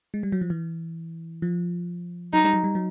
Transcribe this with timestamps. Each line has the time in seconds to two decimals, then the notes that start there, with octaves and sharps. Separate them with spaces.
0.14 G#3
0.23 G3
0.32 F#3
0.41 F3
0.50 E3
1.42 F3
2.33 F#3 D#4
2.44 G3
2.53 F#3
2.64 G3
2.75 F#3